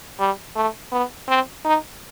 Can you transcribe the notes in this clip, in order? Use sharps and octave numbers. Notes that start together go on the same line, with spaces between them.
G3
A3
B3
C4
D#4